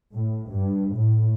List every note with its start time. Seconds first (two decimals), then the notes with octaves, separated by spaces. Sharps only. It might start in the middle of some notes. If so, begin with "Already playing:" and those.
0.13 A2
0.51 G2
0.96 A2